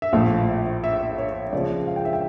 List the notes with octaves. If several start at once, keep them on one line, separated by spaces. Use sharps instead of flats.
E5
A#1 A2 F3 A3 F5
E5
E5
C#5
C#2 C#3 F3 D5
F5
G5
E5
G5